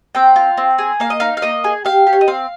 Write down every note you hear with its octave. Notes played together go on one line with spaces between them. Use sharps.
C4 G5
F4
C4
G#4
A#3 F5
D#5
D#4 F5
F5
A#3 D#5
G#4
G4 F5
G4
C#5
D#5
C4 F5